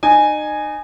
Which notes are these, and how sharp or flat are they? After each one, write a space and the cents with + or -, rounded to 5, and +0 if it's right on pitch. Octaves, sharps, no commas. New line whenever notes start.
D#4 -30 G#5 +0